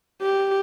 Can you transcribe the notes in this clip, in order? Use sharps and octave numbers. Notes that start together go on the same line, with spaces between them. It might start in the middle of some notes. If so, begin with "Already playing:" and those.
G4